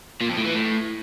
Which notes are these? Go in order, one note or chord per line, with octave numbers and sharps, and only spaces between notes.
A#2
F2
A2
E3
A2